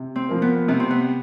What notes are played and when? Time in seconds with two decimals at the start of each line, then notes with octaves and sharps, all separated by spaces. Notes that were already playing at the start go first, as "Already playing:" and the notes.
Already playing: C3
0.16 C4
0.29 F3 A#3
0.42 B3
0.68 C3 B3
0.80 C4
0.91 B3